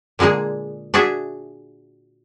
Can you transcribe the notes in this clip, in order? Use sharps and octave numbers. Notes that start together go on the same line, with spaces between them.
A#2 D3 G#3 A#3 G#4
D4 F#4 G#4 E5